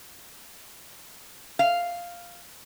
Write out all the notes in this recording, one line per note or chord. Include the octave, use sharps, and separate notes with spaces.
F5